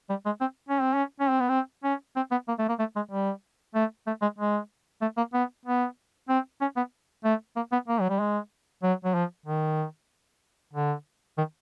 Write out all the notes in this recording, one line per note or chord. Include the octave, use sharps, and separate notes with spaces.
G3
G#3
C4
C#4
C4
C#4
C#4
C4
B3
C4
C#4
C4
B3
A#3
A3
A#3
A3
G#3
G3
A3
A3
G#3
G#3
A3
A#3
B3
B3
C4
C#4
B3
A3
A#3
B3
A#3
F#3
G3
G#3
F#3
F#3
F3
D#3
D3
D#3